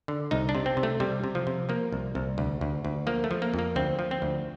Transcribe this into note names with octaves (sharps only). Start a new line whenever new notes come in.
D3
C2 D#4
D4
C3
C4
C3
A3
C3 G3
C3
F3
C3
F3 A#3
C2
C2
D2
D2
D2
F3 A#3
A3
F3
A#3
F2
A#3
D2 C4
F3
C4
D2